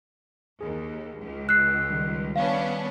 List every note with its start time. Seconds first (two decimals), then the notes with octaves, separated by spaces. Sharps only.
0.61 D#2 G#4
1.18 C#2
1.49 E6 F#6 C7
1.90 D#3 G3
2.36 B3 C#4 D4 F5